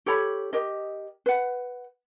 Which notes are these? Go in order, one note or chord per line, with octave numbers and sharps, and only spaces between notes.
G4 A4 C#5 B5
G4 A#4 D#5
B4 F#5